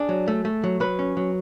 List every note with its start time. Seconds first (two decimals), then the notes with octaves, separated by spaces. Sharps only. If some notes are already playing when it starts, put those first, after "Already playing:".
Already playing: D4 G#4
0.09 F#3
0.28 A3
0.45 A3
0.64 F#3
0.80 F#3 B4
0.99 C#4
1.17 F#3